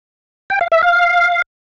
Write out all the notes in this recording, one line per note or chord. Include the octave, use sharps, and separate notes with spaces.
G5
F5
E5
F5